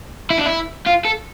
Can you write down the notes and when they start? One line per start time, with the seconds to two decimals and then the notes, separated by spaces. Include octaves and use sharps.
0.30 E4
0.38 D4
0.46 E4
0.86 F4
1.05 A4